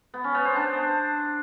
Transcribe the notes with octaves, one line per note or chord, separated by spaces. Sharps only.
B3
C#4
B3
C5
D4